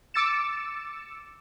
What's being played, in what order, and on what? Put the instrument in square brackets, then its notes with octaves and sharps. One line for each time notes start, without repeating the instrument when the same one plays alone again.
[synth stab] D6 E6 A6 C#7 E7